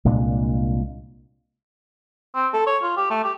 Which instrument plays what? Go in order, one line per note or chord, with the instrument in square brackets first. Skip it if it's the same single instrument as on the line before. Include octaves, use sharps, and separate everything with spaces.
[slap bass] C2 A#2 G#3 D4
[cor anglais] C4
A4
C#5
F4
G4
A3
G4